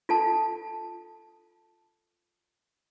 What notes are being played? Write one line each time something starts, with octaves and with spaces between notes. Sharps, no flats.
F4 A4 A5